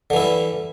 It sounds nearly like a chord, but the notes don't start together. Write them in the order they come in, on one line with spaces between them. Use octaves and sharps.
D3 E3 E4 G3